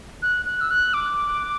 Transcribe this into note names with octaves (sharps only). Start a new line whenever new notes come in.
F#6
F#6
E6
F#6
D6